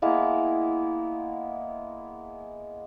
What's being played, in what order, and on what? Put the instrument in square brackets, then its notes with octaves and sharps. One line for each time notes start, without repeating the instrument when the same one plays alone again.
[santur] G#3 A#3 B3 E4